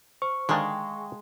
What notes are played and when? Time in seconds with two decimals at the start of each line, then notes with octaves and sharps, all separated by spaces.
0.22 C5 C#6
0.49 D3 D#3 G#3 D4 F5 G5 A5